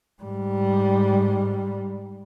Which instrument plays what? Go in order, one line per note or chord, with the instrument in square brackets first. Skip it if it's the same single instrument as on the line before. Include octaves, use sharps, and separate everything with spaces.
[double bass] G#2 G3